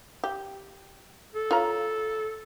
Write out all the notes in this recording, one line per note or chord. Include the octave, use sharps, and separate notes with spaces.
G4
A4
F4 C#5 A#5